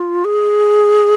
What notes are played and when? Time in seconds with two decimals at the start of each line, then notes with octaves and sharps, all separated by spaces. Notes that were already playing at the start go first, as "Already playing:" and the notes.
Already playing: F4
0.25 G#4